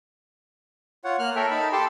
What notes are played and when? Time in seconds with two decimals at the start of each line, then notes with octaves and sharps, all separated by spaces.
1.04 F4 C#5 F#5
1.19 A#3 F6 F#6
1.36 A4 A#4 C#5 E5 G5
1.51 D#4 A5 B5
1.72 G4 A4 G5 A5 C6